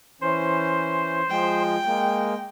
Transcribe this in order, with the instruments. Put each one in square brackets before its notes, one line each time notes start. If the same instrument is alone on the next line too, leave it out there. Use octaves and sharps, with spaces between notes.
[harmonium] E3 C#4 [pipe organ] C5
[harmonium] F3 G#3 [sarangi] G5
[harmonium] G#3 A#3